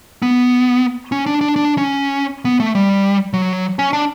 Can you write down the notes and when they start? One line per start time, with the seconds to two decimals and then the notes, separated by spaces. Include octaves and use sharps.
0.22 B3
1.12 C#4
1.26 D4
1.41 D4
1.56 D4
1.78 C#4
2.45 B3
2.60 A3
2.75 G3
3.33 F#3
3.79 C#4
3.93 D4